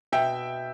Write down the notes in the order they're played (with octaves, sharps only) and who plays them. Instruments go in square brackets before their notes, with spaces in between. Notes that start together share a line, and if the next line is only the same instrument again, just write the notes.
[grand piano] B2 E5 G5